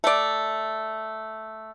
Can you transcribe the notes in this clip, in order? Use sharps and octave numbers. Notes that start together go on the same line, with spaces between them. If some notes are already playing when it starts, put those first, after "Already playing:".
A3 D5